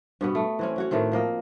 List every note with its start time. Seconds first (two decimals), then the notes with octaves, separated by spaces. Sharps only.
0.21 G2 B2 B3
0.35 A3
0.59 E3 C4 C#4
0.76 C#4 F#4 C#5
0.91 A2 D#3 A3 C4
1.12 F3 A#3 D#5